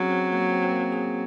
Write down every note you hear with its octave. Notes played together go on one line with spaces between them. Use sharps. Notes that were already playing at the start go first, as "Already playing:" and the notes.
Already playing: F#3 C4 C#4 G#4
C4
A#3
C4
C4
A#3
G#4